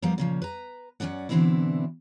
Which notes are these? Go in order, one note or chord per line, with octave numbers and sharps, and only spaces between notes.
F3 G3 A#3 B3
A#2 C#3 F3
B4 A#5
F#2 E3 C#4 D5 F#5
B2 D3 E3 C4 D4 E4